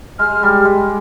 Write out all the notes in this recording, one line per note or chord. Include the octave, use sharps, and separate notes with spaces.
G#3 F6
G3
G#3